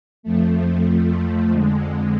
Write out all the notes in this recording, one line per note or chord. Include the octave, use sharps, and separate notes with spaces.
F2 F3 A3
F2 D3 G#3